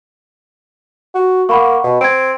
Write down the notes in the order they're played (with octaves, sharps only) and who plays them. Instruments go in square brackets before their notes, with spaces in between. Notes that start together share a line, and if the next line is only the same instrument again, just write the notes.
[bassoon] F#4
[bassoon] A#3 [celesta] F#5 B5 C#6
[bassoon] B2
[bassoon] C4 [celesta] G#6 D7